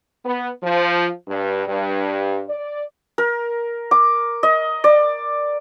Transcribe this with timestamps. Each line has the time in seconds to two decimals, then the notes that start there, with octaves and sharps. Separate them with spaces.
0.24 B3
0.63 F3
1.28 G2
1.67 G2
2.49 D5
3.18 A#4
3.91 D6
4.43 D#5
4.84 D5